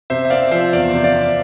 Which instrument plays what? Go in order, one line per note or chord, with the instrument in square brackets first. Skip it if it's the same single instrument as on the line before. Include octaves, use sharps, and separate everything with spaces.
[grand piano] C3 [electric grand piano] C5 E5
[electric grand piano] E5
[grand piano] C4 [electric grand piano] D5 F5
[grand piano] F3 [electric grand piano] C5 E5
[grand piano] E2 [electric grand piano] D5 F5
[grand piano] C3
[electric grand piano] D5 F5
[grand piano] C4